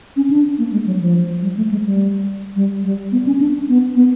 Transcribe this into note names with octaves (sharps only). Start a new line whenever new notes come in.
C#4
D4
A#3
G#3
F#3
F3
G3
A3
G#3
G3
G3
G3
B3
C#4
D4
B3
B3